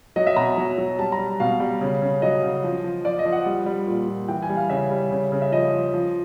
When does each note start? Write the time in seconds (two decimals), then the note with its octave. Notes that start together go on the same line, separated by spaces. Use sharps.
0.16 F#3 D#5
0.27 E5
0.36 B2 A#5
0.57 F#3
0.78 F#3
0.98 G3 A5
1.12 A#5
1.19 G3
1.40 B2 F5
1.60 G3
1.81 C#3
2.02 C#3
2.22 F#3 D#5
2.43 C#3
2.64 F3
2.84 F3
3.05 F3 D5
3.19 D#5
3.25 F3
3.32 F#5
3.46 G3
3.66 G3
3.87 A#2
4.08 A#2
4.29 E3 G5
4.43 G#5
4.49 G3
4.56 F5
4.70 C#3 E5
4.91 G3
5.11 C#3
5.32 C#3
5.42 E5
5.52 F3 D#5
5.73 F3
5.94 F3